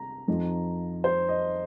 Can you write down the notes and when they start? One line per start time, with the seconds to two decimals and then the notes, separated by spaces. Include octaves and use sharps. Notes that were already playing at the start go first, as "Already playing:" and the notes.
Already playing: C3 C4 A#5
0.28 F2 F3 D#4
1.04 C5
1.29 D#5